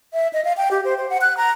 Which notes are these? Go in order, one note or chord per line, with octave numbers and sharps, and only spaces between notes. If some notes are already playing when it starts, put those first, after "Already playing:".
E5
D#5
F5
G5
G4
C5
C5
F#5
F#6
A#5